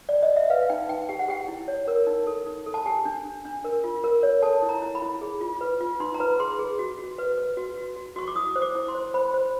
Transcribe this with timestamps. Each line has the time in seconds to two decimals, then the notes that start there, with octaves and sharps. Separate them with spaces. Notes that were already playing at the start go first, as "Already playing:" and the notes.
0.09 D5
0.23 D#5
0.36 E5
0.50 B4 F5
0.69 D#4 G5
0.89 D#4 G5
1.09 G4 G5
1.19 F#5
1.28 G4 G5
1.48 E4
1.68 C#5
1.88 A#4
2.07 D#4
2.27 A4
2.46 D#4
2.66 A4
2.74 A5
2.86 G4 G#5
3.05 D4
3.25 D4
3.45 D4
3.64 A#4
3.84 F4
4.04 A#4
4.23 C#5
4.42 A4 A5
4.62 E4
4.69 A#5
4.82 E4
4.95 B5
5.02 E4
5.21 G#4
5.41 F4
5.61 B4
5.81 F4
6.00 D#4 C6
6.14 A#5
6.20 B4 B5
6.39 G#4 C6
6.59 G#4
6.79 F#4
6.99 F#4
7.18 B4
7.38 B4
7.57 F#4
7.77 F#4
7.96 F#4
8.16 F#4 C#6
8.27 D6
8.35 E4 D#6
8.56 C5
8.62 D6
8.75 E4
8.88 C6
8.95 C5
9.14 C5 B5
9.34 C5